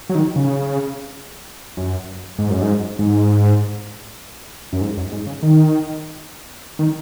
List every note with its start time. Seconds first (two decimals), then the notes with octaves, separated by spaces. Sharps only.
0.09 F#3
0.15 D#3
0.36 C#3
1.77 F#2
2.38 G#2
2.50 F#2
2.62 G#2
2.99 G#2
4.73 F#2
4.81 G#2
4.97 F#2
5.12 G#2
5.26 C#3
5.43 D#3
6.79 D#3